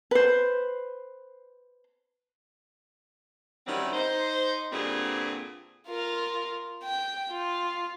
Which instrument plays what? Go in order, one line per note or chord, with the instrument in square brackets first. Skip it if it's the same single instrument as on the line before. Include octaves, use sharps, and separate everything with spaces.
[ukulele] B4 C5
[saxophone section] D#3 E3 F#3 G3 C4 C#4
D#4 C5
G2 A#2 D3 G3 C4 G#4
[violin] F4 A#4
G5
F4